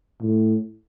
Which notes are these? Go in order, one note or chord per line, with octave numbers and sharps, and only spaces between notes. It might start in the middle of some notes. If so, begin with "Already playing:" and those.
A2